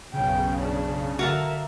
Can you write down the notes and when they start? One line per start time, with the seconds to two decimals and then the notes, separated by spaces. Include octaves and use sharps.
0.14 B1 F#2 C#3 G5
0.58 D4
1.19 D3 F#4 A#4 E5 F5 A5